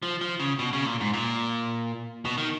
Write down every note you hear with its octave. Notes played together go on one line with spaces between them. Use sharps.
F3
F3
C#3
B2
C#3
A#2
G#2
A#2
B2
D#3